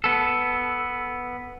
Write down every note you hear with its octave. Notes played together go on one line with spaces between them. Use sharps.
B3 A4